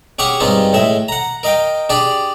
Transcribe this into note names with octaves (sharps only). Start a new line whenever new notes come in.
C#4 G4 G#4 C#5 F#5 C#6
G2 G#3 C4 C#4 D#4 F4
A2 G#3 E5
F#5 A#5
A#4 D#5 F5 G5
D4 G4 G#4 D5